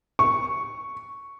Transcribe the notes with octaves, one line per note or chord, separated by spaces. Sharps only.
C#6